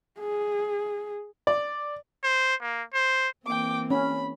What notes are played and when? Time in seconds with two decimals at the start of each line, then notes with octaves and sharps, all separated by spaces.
0.20 G#4
1.47 D5
2.24 C5
2.61 A#3
2.94 C5
3.46 E3 A#3 C4 G5 D6
3.90 C#4 B5